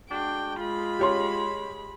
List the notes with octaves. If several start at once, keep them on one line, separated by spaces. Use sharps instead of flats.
G#3 D4 F#4 G5
G#3 F4 B5
G4 C#5 C6